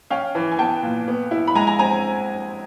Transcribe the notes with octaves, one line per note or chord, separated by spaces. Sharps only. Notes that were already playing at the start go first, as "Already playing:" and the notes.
C#4 F5 G5
E3
G#5
B3 G5 A5
A#2
B3
E4
B5
G#3 G#5 A#5
G#5 A#5
C4 G#5 A#5